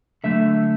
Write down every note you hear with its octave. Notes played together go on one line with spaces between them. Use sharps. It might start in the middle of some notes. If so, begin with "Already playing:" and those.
D3 F#3 A3 E5